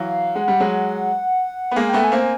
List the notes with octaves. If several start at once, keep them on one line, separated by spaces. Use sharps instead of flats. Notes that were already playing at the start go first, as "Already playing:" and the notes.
Already playing: E3 F#3 F5
G#3 F#5
G3
F#3 G#3
B3
G#3 A#3 G#5
A3 B3 G5
G#5
A#3 C4